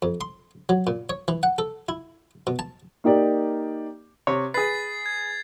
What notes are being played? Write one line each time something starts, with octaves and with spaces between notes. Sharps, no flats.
F2
C6
F#3
A#2
C#5
E3
F#5
A4
E4
B2
A5
A#3 D#4 G4 D5
C3 C#5
G#4 B4 A6 C7
G#6